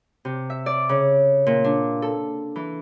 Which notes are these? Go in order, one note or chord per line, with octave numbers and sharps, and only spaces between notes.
C3
E5
D5
C#3
A#2
D4
A4
E3